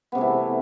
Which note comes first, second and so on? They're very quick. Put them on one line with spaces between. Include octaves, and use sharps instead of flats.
B3 C3 A3 E3